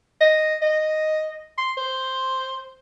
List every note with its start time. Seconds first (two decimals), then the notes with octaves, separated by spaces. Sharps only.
0.21 D#5
0.62 D#5
1.58 C6
1.77 C5